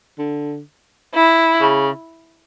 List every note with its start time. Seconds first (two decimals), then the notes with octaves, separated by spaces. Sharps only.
0.19 D3
1.14 E4
1.61 C#3